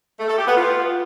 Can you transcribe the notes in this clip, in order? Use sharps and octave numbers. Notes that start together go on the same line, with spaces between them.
A3
A4
G4
B3
F4